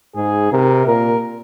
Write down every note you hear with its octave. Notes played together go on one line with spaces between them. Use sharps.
G#2 G#4
C3 A#4
A#2 A#4